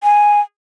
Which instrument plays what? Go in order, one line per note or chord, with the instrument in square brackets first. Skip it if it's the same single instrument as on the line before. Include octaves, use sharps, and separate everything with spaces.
[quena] G#5